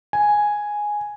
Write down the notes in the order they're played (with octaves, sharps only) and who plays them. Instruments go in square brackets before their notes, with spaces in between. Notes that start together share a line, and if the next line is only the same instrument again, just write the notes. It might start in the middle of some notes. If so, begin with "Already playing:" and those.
[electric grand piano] G#5